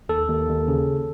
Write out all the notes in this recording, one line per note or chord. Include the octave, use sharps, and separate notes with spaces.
D#2 A4
D#2
D#2
C#3